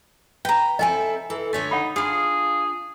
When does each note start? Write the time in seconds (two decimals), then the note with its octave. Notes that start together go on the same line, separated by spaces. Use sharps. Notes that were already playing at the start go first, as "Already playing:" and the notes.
0.45 B4 G5 A#5
0.79 C4 E4 A4 D#5 G#5
1.30 E3 A4
1.53 D3 A3 C#5 G#5
1.71 D#4 F#5 B5
1.96 D4 F4 G#4 F5